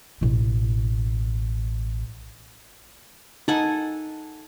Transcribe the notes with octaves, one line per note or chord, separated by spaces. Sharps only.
A1 B2
D#4 A4 F#5 G#5